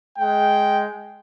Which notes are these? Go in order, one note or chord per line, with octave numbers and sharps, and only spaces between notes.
G#3 G5